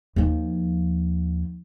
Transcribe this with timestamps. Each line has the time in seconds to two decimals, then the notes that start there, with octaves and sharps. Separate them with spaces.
0.16 D#2 F3